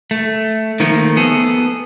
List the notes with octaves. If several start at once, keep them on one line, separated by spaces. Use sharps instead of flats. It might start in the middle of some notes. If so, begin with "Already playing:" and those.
A3
D#3 F3 A3 A#3
B3 G#4 A4